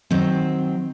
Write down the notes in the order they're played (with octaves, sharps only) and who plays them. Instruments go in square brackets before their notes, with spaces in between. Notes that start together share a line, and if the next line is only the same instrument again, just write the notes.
[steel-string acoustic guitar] D#3 F#3 C4